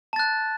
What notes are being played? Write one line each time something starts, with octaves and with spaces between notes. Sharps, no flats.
A5 F#6 A6